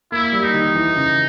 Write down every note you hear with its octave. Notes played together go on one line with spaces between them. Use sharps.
A#3 E4
G3
D#4
D#3
E3
C#3